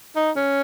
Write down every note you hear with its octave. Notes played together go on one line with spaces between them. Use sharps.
D#4
C#4